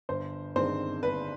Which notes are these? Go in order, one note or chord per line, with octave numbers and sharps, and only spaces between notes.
G1 C5
G2 D#3 G#3 C4 C5
G1 B4